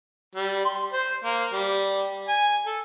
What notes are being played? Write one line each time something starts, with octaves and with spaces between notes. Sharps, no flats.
G3
C6
C5
A#3
G3
G#5
A4